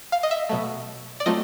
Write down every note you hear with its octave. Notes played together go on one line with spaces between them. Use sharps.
F5
D#5
E5
B2 F#3 A3
D5
F#3 A3 C4 F4 D#5